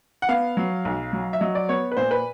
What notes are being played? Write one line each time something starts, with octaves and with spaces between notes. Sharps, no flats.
F#5
B3 F5
F#3
B1
F#3
E5
F#3 D#5
D5
B3 C#5
B4
A#2 C5
B4